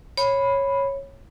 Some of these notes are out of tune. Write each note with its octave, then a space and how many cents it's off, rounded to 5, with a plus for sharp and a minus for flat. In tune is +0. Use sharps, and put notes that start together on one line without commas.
C#5 -10 B5 +0